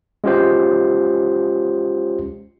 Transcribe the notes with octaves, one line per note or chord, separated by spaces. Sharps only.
G#3 C#4 F4 G4 C5